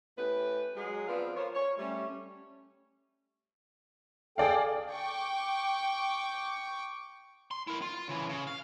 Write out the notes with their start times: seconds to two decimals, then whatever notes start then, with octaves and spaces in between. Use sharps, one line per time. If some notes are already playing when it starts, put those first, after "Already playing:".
0.17 A2 C#4 G4 B4
0.76 F#3 G#3 G#4
1.07 F3 B3 C4 F4 B4 D5
1.36 F4 A#4 C5 C#5
1.54 C#5
1.78 G3 A3 C#4
4.38 G#4 A4 D5 F5 G5
4.91 G5 C#6 D6
7.51 C6
7.67 E4 A#4
7.82 F4
8.09 C#3 E3
8.29 C#3
8.47 F5